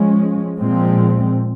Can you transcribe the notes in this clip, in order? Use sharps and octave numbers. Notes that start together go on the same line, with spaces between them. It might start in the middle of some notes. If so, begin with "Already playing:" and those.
Already playing: F3 G#3 C#4
A#2 F3 G#3 C4